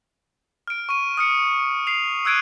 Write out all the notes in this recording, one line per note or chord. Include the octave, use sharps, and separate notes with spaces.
F6 D7
C#6 D#7
D#6 F6 C#7
C7 F7
E6 F#6 G#6 D7 D#7